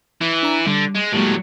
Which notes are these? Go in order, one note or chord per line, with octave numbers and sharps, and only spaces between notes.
E3 E4
D4 A#5
D3 G3
G#3
A2 F#3 G#3 A#3 G4